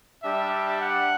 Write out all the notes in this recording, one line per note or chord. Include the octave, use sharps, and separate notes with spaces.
G3 D4 G4 E5
F#5